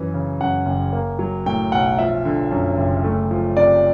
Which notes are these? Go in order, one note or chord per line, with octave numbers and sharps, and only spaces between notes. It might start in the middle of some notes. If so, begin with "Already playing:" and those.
Already playing: F#2 E3
C#3
F#2 F#5
F#1
A#3
F#3
A2 G5
B1 F#5
F3 E5
D3
F#2
F#1
A3
F3
C3 D5